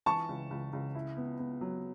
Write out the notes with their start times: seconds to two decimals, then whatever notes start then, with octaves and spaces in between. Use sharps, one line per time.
0.06 E3 A5 C#6
0.29 C#2
0.50 C#2
0.73 C#2
0.95 E4
1.17 B3
1.39 B3
1.61 F#3